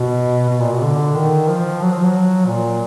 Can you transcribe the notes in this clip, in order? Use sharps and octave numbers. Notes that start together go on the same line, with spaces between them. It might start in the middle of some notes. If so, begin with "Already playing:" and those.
Already playing: B2
B2
A#2
B2
D3
D#3
F3
F#3
F3
F#3
A#2